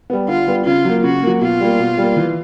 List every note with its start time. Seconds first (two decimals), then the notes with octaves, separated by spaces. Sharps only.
0.10 G3 B3
0.28 D3 F4
0.47 G3 B3
0.65 C#3 F4
0.85 F#3 A#3
1.03 C#3 F#4
1.22 F#3 A#3
1.41 B2 F4
1.60 G3 A#3
1.79 B2
1.98 G3 A#3
2.17 E3